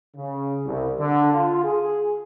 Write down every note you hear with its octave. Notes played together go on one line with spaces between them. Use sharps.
C#3
C2
D3
F4
G#4